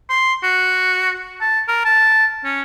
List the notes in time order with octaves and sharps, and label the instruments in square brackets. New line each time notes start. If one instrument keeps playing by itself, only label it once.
[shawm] C6
F#4
A5
A#4
A5
C#4